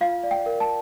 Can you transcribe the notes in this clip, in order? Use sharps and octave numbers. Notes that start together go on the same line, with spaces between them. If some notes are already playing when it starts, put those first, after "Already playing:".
F4 F5
D5
G5
A#4
A5